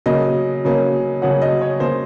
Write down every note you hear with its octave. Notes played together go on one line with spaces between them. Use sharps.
C#3 F#3 A#3 C#4 D#5
C#3 F#3 A#3 C#4
C#3 F#3 A#3 C#4 F#5
D#5
C#5
C#3 F#3 A#3 C#4 C5